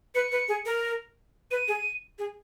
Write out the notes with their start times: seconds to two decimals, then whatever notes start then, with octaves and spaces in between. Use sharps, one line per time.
0.15 B4 C#7
0.32 B4
0.48 G#4
0.66 A#4
1.51 B4 D#7
1.68 G#4
2.19 G#4